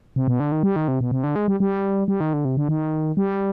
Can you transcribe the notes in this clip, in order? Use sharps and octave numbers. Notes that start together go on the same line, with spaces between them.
C3
B2
D3
D#3
G3
D#3
C3
B2
C3
D3
G#3
G3
G3
G3
D#3
D3
C3
D3
D#3
G3